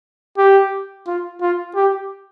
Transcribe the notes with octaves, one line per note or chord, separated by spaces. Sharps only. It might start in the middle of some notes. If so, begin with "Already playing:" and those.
G4
F4
F4
G4